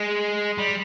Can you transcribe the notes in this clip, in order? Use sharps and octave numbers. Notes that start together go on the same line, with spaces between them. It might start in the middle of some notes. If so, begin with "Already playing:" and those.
Already playing: G#3
G3